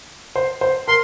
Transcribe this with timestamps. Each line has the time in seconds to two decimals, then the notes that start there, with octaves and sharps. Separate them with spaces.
0.36 C5
0.61 C5
0.88 A#4 C6